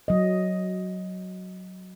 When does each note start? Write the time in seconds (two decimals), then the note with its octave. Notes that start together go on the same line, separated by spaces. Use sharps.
0.08 F#3 D#5